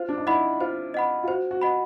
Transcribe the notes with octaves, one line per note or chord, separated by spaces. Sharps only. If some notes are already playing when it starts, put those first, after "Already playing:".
Already playing: F4 C5
D4
D#4
E4 D#5 F#5 B5
F4 C5
D#5 F#5 B5
F4
F#4 C5
F#4
D#5 F#5 B5